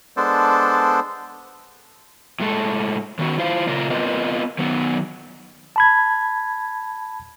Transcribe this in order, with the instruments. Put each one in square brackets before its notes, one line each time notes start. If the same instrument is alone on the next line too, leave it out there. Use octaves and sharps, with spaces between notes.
[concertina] G#3 B3 D4 A4 C5 D5
[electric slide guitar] A2 G#3 A4 A5
D#3 B3 F#4
E4 F4 C5 F5
A#2 C#3 F4 A#4
B3 C4 F4 A#4 B4 D#5
D#3 F#3 B3 D#4
[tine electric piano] A5 B5 G#6